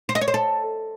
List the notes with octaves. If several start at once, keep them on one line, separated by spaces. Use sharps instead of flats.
C5
D#5
C#5
C5
A4